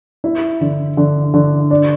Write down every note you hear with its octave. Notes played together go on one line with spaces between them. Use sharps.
E4
D3
D3
D3
D4